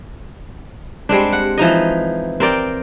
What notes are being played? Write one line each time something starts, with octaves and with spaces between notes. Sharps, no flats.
G3 G#3 C4 D4
F#5
E3 F3 D#4 D#5
C4 A#4 D5 G5